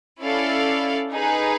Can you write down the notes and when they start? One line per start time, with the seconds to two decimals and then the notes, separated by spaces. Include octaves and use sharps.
0.21 C#4 E4 A4 D5 F5
1.12 D#4 G#4 B4